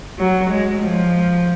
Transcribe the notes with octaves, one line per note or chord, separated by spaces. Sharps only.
F#3
G#3
F3